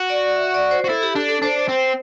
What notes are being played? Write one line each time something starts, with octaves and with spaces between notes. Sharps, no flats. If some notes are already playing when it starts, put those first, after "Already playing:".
Already playing: F#4
D5
E5
D5
C5
F#4
E4 A4
G4
D4 A4
A4
D4 C5
C4